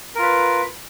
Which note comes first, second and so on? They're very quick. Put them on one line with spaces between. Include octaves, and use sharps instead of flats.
A#4 F4 B4